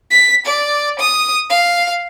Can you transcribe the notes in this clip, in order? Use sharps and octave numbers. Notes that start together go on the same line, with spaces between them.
B6
D5
D#6
F5